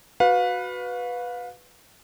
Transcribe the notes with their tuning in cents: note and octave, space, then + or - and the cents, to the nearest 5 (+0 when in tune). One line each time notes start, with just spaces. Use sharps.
F#4 +0 B4 +0 F5 +30